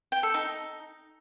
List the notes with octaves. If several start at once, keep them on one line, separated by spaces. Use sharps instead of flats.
G5
A4
D#4